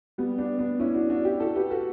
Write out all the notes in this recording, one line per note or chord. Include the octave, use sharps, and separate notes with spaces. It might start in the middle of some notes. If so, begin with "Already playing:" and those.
G3 B3
B3 D4
B3 D4
C#4 E4
D4 F#4
D4 F#4
E4 G4
F#4 A4
G4 B4
F#4 A4